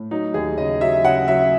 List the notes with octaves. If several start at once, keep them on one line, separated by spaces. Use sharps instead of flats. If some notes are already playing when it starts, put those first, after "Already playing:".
Already playing: A2
F#3 D#4
D#2 G#4
C#3 D#5
F#3 E5
C#3 F#5
F#3 E5